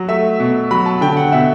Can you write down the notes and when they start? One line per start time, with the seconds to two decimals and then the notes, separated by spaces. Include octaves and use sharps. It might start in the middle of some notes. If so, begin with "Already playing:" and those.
Already playing: F#3
0.08 A3 E5
0.40 B2
0.71 F#3 B5
0.86 A5
1.01 D3 G5
1.17 F#5
1.32 B2 E5